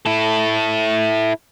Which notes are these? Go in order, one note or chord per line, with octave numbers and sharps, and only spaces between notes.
E4 A4